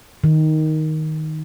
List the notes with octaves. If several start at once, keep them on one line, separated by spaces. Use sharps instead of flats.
D#3